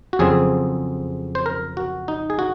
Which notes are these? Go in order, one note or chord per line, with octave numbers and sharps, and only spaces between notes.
F#4
F2 C#3 F#3 C4 G#4
C5
A#4
F#4
D#4
G#4
F#4